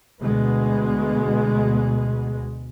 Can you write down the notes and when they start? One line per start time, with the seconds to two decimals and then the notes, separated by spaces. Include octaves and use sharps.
0.21 D2 B2 G#3 B3